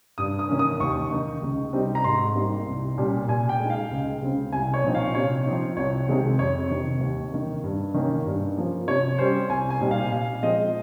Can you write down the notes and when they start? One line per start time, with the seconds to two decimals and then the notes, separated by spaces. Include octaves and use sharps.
0.18 G2 D#6
0.39 D#6
0.49 D#3 A#3 C#4
0.59 D#6
0.80 D#2 C#6
1.11 D#3 A#3 D#4
1.43 C#2
1.73 C3 G3 C4 D#4
1.95 A#5
2.04 G#2 C6
2.35 G3 A#3 D#4
2.66 C2
2.98 A#2 G3 C#4
3.28 A#2 G#5
3.49 G5
3.60 G#3 D#4
3.70 F5
3.91 C#2
4.22 C#3 G#3 C4
4.53 C2 G#5
4.74 C#5
4.84 A#2 F3 C4 D#4
4.95 F5
5.15 C3 C#5
5.46 F3 C4 D#4
5.77 C2 C#5
6.08 C3 D#3 G#3 C4
6.39 F2 C#5
6.70 C3 D#3
7.01 D#2
7.32 D#3 A#3
7.64 G2
7.94 D#3 A#3 C#4
8.26 G2
8.57 F3 A#3 C#4
8.88 C3 C#5
9.18 G3 C#4 C5
9.49 C2 G#5
9.70 G#5
9.81 A#2 G3 C4 D#4
9.91 F5
10.12 A#2 F5
10.43 F3 G#3 C4 D#5